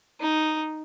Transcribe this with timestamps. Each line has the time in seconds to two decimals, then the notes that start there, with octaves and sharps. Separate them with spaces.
0.20 D#4